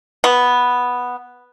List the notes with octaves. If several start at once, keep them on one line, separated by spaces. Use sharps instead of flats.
B3